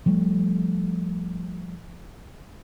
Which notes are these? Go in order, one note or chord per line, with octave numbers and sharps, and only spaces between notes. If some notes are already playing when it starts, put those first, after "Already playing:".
F3 G3 A3